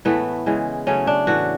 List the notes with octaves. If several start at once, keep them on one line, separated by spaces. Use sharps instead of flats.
A2 E3 A3 B3
C#3 E3 G#3
C#3 F#3 A3 C#4
D4
A2 E3 A3 F#4